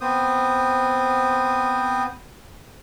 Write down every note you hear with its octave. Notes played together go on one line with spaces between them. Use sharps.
B3 C4 C5 D#6